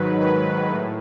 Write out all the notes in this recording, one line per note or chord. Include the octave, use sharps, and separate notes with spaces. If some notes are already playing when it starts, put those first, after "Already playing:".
Already playing: G#2 D#3 F#3 B4
B4
A2